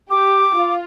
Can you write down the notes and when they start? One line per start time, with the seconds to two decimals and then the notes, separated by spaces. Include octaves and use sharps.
0.10 G4 D6
0.55 F4